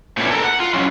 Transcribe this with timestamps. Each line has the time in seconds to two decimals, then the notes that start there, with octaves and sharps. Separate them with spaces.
0.17 A#2 A3 B3 C#4 D4 E4
0.31 A4 A#4
0.44 F#5
0.60 F4
0.74 F#3 C#4 E4